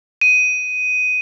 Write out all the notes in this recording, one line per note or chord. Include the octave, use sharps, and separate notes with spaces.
D#7